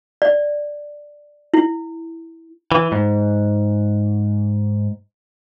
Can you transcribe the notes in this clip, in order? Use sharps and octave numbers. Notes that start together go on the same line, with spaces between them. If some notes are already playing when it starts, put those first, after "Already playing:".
D5
E4
E3
G#2